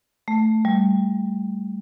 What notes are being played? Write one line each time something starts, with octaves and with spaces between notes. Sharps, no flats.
A3
G3